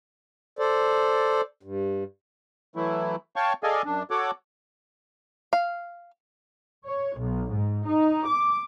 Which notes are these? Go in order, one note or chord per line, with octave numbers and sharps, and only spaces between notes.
A4 C5 D5
G2
E3 F#3 A3 E4
C#5 F5 G5 A5 C#6
G#4 A4 D5 D#5 F5 G#5
F#2 D4
F#4 A4 C#5 F#5 D6
F5
C#5
B1
G#2
D#4
D6